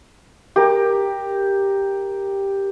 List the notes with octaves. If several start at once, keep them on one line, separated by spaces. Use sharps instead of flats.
G4 A#4